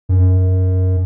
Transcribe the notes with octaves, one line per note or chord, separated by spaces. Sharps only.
F#2